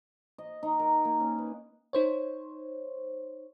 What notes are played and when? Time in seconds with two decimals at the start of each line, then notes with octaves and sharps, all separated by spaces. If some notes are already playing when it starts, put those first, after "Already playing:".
0.38 D#5
0.63 D#4
0.80 A#4
1.05 A#3
1.20 C#4
1.38 B4
1.93 D#4 C5 C#5